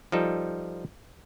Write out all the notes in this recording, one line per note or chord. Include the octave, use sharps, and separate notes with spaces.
F3 G3 D#4 A4